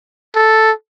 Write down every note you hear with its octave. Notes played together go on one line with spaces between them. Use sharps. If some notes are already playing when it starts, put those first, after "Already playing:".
A4